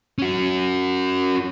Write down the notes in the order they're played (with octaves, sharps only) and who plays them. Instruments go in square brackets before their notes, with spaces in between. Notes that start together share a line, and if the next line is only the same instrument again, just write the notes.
[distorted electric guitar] C#4 F#4